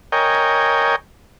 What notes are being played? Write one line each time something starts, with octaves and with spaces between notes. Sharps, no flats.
A#4 C#5 D#5 G5 G#5